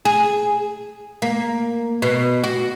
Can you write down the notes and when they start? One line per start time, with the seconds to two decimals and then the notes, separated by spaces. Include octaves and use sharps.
0.05 G#4
1.22 A#3
2.02 B2
2.44 F#4